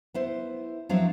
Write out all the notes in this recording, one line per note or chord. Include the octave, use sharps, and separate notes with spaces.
B3 E4 C5
F3 F#3 C4 D4 E4